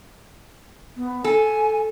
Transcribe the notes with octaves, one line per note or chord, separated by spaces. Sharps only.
B3
A4 G#5